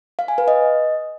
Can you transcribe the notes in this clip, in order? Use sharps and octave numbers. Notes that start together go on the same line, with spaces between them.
F5
G#5
B4
D#5